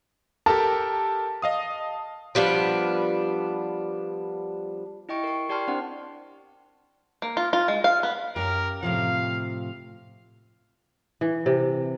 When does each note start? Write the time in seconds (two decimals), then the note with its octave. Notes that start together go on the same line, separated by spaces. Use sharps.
0.46 G4 A4 A#4 A5
1.42 D#5 F5 D#6
2.35 F3 G3 B3 D4
5.09 E4 D#5 G5 C#6 D7
5.24 A#4 C#6
5.49 G4 D5 G5 A5 C6 F6
5.68 C4 D4 C5 F#5
7.22 A#3
7.37 F4
7.53 F4
7.68 G#3
7.84 F5
8.03 B3
8.36 F#2 G4 A#4
8.83 A2 C3 F3 F5
11.21 E3
11.46 C3